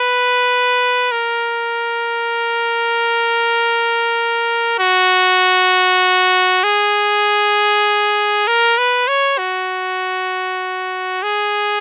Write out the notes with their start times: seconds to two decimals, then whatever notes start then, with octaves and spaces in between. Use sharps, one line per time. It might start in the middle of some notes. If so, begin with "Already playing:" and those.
Already playing: B4
1.12 A#4
4.79 F#4
6.64 G#4
8.47 A#4
8.78 B4
9.08 C#5
9.38 F#4
11.23 G#4